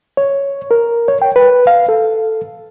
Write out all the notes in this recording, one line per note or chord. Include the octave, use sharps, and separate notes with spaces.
C#5
A#4
C#5
G5
B4
F5
A4